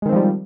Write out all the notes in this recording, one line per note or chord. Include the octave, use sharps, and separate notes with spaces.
D#3 F3 G3 G#3 C4